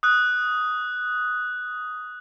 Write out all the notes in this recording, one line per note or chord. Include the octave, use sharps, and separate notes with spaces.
D#6 F#6